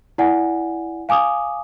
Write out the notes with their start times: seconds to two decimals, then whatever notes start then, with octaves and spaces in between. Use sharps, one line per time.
0.18 E4 D5 F#5 G#5
1.09 F5 G#5 D6 D#6